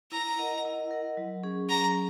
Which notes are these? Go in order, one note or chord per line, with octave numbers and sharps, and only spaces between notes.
E4 A#5
A#4 D#5 F#5
E4
A#4 D#5 F#5
F#3
C#4 G#4
F#3 A#5